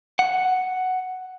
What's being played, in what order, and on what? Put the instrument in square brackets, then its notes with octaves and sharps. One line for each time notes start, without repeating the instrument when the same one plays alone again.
[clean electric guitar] F#5